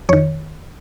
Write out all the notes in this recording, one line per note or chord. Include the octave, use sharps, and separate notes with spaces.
F2 D#3 C#5